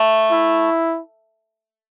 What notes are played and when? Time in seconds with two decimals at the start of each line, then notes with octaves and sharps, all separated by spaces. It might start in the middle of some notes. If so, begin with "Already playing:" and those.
Already playing: A3
0.32 E4